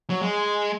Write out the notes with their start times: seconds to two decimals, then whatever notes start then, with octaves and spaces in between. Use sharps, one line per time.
0.10 F#3
0.21 G#3